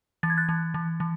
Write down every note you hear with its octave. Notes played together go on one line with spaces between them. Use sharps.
E3 A6
G#6
F#6 A6
E3
E3
E3